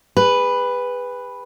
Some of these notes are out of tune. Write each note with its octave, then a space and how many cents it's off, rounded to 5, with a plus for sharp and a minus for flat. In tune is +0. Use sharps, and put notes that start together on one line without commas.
G#4 -40 B4 +0